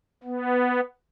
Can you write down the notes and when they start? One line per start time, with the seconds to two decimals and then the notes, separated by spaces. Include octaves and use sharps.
0.24 B3